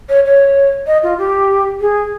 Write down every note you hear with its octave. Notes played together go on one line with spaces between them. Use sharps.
C#5
C#5
D#5
F4
G4
G#4